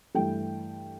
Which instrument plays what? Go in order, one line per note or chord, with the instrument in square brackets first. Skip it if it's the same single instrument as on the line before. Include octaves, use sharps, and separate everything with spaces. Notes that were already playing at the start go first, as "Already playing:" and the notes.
[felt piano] G2 E3 A3 G5